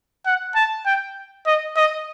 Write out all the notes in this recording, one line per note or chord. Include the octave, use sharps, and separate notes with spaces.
F#5
A5
G5
D#5
D#5